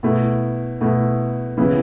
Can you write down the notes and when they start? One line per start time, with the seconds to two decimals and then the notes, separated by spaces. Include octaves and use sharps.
0.03 B2 A3 E4
0.81 B2 A3 E4
1.57 C#3 E3 B3 E4